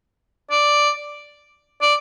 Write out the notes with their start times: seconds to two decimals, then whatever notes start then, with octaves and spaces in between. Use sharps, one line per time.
0.51 D5
1.82 D5